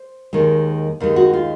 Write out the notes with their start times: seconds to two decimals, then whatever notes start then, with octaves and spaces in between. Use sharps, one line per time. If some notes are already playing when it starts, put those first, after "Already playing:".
Already playing: C5
0.33 D#2 D#3 G#3
1.00 D#2 D#3 G#3
1.16 F#4
1.33 F4